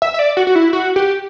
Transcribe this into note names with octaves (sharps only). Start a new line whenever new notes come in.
E5
E5
D5
F#4
F#4
E4
F#4
G4